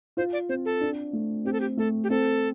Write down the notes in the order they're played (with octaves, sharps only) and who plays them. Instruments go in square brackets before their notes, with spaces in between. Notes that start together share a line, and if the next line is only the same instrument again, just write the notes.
[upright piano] F4 [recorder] C5
[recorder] D5
[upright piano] C4 [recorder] C5
[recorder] A4
[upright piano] D4
A3
[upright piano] C4 [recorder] G4
[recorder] A4
G4
[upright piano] A3 [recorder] A4
[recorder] G4
[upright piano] C4 [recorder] A4